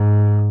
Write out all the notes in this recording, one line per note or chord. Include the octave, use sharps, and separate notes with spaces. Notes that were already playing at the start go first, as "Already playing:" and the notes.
Already playing: G#2